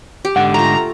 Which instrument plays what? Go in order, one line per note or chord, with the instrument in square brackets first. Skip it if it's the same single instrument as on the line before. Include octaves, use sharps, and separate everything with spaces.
[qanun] G4
[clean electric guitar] G#2 D3 [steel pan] F#5
[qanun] A3 F4 [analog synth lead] A#5